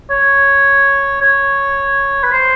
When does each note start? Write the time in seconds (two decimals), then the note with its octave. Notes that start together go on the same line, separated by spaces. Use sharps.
0.10 C#5
1.22 C#5
2.23 B4
2.32 C5